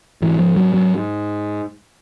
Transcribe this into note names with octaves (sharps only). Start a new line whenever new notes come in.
G#2 E3
F3
F#3
F#3